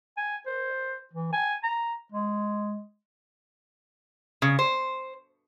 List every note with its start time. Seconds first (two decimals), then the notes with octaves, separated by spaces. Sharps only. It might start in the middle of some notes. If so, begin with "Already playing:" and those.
0.18 G#5
0.47 C5
1.13 E3
1.33 G#5
1.64 A#5
2.12 G#3
4.42 C#3
4.59 C5